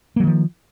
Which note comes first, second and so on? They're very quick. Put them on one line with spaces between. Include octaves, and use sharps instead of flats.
A#3 F#3 D#3 F3